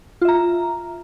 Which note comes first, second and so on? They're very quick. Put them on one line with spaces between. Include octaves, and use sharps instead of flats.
F4 E5 A#5